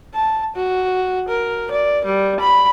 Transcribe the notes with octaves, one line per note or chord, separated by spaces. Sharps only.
A5
F#4
A#4
D5
G3
B5